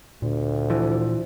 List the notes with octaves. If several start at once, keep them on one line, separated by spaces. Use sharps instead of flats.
D2 A#2
E3 F3